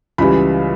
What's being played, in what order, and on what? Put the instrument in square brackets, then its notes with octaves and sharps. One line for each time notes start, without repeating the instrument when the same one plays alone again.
[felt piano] C#2 C#3 E3 G3 B5